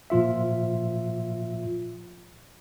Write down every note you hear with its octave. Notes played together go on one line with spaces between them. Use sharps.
A#2 F3 F4 E5